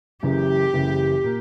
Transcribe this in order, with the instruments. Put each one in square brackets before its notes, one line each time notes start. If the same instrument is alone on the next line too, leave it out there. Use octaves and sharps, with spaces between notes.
[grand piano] F#1 F#2 C#3 E3 [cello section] G4
[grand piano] F#1 F#2 C#3 E3
A#2 A#3